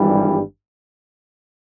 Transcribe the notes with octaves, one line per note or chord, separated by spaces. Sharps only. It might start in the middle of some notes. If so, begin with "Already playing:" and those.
Already playing: G#1 G2 E3 G3